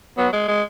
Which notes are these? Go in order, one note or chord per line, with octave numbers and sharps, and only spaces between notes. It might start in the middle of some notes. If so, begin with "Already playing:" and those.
F#3 B3
G#3
G#3